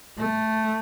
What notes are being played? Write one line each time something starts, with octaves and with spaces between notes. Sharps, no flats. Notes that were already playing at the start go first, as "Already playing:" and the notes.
A3